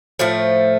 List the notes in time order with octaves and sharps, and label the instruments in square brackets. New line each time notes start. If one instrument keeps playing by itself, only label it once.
[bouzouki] A2 F3 A3